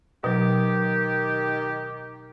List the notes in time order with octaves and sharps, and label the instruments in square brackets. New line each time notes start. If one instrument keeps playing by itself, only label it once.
[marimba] B2 F#3 [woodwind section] D#3 G4